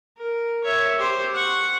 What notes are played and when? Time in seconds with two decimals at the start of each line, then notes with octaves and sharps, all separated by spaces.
0.17 A#4
0.64 C#5 E5
0.98 G4 C5
1.34 F#5 C#6